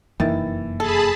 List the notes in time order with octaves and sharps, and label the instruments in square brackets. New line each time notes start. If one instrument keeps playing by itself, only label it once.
[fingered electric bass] F1 F#2 A#3 [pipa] D#3 [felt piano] E3 E4 A6
[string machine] G#4 A5 B5 [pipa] A4